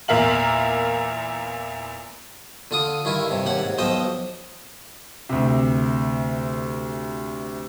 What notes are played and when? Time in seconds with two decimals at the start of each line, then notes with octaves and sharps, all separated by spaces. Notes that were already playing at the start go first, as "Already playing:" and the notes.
0.08 E2 A#2 A#4 E5 F5 F#7
2.71 D3 F4 D#6
3.05 G2 D#3 E4 F4
3.31 G2 C3
3.46 D#2 G4 F#5
3.59 G#2
3.78 B1 F3 C5 D#5 G5
5.29 D2 C3